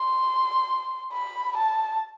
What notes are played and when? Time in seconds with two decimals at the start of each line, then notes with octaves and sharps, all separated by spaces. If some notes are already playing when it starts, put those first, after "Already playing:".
Already playing: C6
1.13 B5
1.57 A5